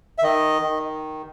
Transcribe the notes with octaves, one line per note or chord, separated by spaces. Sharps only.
E5
D#3 D#5
D#3